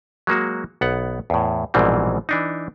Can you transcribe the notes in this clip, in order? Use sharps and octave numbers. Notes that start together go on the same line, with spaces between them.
F#3 G#3 A#3 F#4
B1 B3 F#5
E2 A2
A#1 G#2 B2 E3 G3 C4
E3 D4 D#4